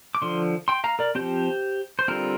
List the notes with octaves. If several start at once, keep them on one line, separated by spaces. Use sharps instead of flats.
D6
D3 F3 C6
G5 C6
F5 A#5
A#4 D5
F3 C4 G4 C5
C5
D3 G3 C4 F4 A#4